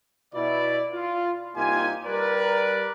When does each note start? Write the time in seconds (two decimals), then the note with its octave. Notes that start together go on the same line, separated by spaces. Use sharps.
0.34 B2 E4 D5
0.93 F4
1.56 C2 A#3 D#4 F4 G4 G#5
2.06 G3 A#4 B4 D5